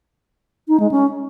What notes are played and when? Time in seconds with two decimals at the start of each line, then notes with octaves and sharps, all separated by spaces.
0.68 D#4
0.80 G#3
0.91 C#4